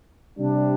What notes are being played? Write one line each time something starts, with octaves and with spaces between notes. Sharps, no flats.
C3 G3 D4